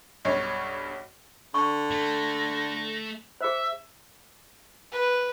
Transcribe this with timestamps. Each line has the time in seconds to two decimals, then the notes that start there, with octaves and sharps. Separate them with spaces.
0.25 B1 G2 C#5
1.54 D3 C#6
1.91 A3 A#6
3.41 G#4 C5 E5
4.92 B4